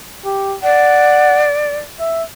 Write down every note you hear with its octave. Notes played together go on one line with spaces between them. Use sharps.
G4
D5 F#5
E5